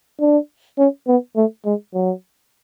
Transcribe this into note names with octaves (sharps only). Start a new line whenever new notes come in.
D4
C#4
B3
A3
G#3
F#3